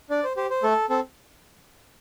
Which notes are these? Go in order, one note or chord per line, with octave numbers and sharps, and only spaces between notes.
D4 D5
C5
G4 C5
C5
A3 A4
C4 A4